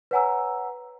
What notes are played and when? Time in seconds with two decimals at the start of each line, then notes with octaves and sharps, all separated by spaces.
0.11 B4 C#5 F#5 G#5 A#5 E6